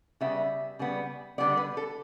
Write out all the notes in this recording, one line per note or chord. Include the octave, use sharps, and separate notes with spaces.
C#3 G3 B3 E5
C#3 G3 B3
D3 G3 B3 D5
B4
A4